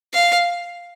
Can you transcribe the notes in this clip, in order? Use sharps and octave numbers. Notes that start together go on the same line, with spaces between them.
F5